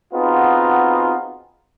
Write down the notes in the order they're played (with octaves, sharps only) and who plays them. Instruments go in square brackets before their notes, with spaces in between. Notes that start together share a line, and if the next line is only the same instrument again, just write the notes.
[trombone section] B3 C4 D#4 F4 F#4 G#4